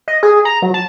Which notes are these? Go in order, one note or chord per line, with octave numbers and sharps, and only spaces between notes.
D#5
G#4
A#5
F#3
A5